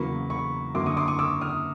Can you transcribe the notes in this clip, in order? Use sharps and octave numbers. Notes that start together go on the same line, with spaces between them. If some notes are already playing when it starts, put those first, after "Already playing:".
Already playing: E2 C#3 F#3 A#3 B5 C#6
B5 C#6
F#2 D3 F#3 A#3 C6 D6
C#6 D#6
C6 D6
C#6 D#6
D6 E6
D#6 F6